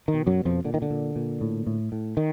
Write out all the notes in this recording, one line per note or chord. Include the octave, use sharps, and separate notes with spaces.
D#3
B2
F#2 F#3
B2
F2 F3
A#2 D3
D#3
D3
A#2
A#2
A2
A2
A2
D#3